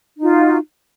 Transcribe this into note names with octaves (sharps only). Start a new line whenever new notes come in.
D#4 F4 F#4